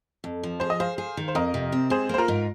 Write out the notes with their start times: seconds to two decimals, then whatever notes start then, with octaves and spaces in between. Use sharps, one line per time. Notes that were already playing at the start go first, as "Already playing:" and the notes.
0.24 F2
0.43 F3
0.60 G#4 C5
0.70 D#5
0.80 G#4 C5 F5
0.98 G#4
1.17 D#3
1.28 C5
1.35 F2 A#4 D#5
1.54 C3
1.72 C4
1.90 G#2 G#4 C5
2.09 A#3 C5
2.18 F4 A#4
2.28 G#2